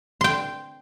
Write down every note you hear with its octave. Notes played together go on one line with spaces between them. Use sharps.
G5 C6